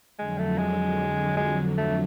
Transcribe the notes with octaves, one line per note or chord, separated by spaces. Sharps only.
F2 D3 F#3 G#3
A3
G#3
G#3
A3